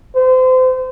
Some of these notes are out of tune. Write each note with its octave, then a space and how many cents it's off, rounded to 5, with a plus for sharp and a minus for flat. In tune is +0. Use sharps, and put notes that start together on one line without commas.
C5 -30